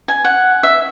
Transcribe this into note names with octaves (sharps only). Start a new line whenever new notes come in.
G#5
F#5
E5